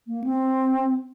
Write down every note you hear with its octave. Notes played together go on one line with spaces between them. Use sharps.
A#3
C4